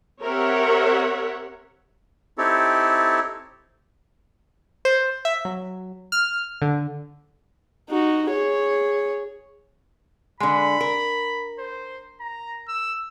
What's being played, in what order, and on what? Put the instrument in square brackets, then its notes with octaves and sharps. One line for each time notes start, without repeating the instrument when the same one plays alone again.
[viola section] C4 G4 A#4 C#5 E5 F#5
[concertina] C4 D#4 E4 G4 A4 C#5
[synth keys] C5
E5
F#3
F6
D3
[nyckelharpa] D#4 F#4
G#4 C#5
[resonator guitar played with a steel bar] D3 G#3 [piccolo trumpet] B5
[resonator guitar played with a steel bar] A#4
[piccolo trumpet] C5
A#5
E6